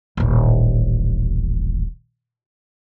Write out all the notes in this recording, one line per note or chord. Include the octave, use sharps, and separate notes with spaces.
D#1 A1